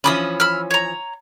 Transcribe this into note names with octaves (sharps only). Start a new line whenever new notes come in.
E3 F3 C#4 B5 D6 D#6
B5 E6 F6
C#5 A#5